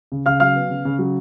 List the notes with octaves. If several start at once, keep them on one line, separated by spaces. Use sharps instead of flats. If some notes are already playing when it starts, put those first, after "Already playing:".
C#3
C#3 F5 F6
F#3 F5 F6
B3
C#3
C#3
F#3